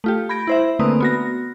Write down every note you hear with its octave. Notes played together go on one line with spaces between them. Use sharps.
A3 F4 G4
B5 G6 G#6 A#6 D7
E4 C5 E5
D3 A3 A#3 C4 B4 D#6
B3 F#4 A#6